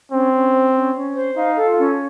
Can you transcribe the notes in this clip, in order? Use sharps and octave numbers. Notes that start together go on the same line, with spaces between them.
C4 C#4
C#4
C5
C#4
C#4
C5
D#4 F5
A4
F4
C#4